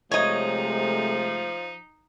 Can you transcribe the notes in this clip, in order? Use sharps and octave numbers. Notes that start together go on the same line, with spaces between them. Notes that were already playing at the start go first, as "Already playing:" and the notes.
C3 F3 G#3 A3 D#4 C#5 D#5